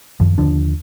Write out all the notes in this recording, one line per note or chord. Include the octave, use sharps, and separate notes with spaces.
F#2 D#3 F3
D#2 D3 F3 D4